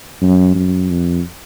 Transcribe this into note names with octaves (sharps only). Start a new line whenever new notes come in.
F#2
F#2
F2